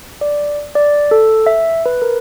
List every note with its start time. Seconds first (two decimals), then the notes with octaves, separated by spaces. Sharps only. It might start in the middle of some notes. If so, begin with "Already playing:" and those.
0.21 D5
0.75 D5
1.11 A4
1.46 E5
1.86 B4
2.02 A#4